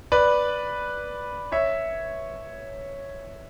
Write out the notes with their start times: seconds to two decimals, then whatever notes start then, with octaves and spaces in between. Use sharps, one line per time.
0.12 B4 D5
1.52 C#5 E5